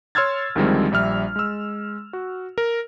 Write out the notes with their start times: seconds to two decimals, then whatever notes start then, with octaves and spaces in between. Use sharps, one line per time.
0.15 C#5 C6 E6 F6 G#6 A6
0.56 D2 D#3 F3 G3 G#3 C4
0.92 A#1 G3 E5 F6
1.36 G#3 E6
2.13 F#4
2.58 A#4